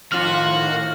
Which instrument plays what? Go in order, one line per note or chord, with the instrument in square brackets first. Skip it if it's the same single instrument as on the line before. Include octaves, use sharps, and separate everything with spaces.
[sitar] F2 F4 [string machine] A2 D#3 [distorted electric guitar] F#4 [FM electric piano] F6